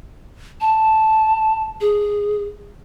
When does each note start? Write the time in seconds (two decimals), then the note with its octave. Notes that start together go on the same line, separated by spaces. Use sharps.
0.61 A5
1.81 G#4